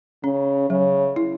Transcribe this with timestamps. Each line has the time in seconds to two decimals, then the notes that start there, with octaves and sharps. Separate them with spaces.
0.24 C#3 C#4
0.70 C#3 F#3
1.16 E4